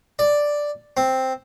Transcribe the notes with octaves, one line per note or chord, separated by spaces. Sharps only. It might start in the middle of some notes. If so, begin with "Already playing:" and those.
D5
C4